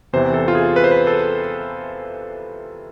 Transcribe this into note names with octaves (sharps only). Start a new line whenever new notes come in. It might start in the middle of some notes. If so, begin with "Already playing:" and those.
E2 C3 E3 C5
A4
F4
G#4
B4
C5
B4
A4